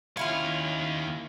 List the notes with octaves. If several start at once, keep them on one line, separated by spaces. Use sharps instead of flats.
D#2 C#4 E4 F4 F5